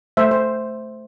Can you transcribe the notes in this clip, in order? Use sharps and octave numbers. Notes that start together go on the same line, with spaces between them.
A3 C5 E5
C5